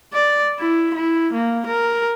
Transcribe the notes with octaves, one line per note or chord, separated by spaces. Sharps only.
D5
E4
E4
A#3
A#4